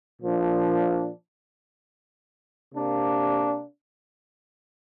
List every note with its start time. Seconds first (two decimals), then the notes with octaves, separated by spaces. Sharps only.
0.21 A#2 F3 D4
2.75 C3 A#3 D4